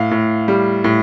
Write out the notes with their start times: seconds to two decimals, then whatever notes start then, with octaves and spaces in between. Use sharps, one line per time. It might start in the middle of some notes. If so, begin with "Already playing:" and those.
Already playing: A2 F5
0.11 A2
0.48 G3
0.84 A2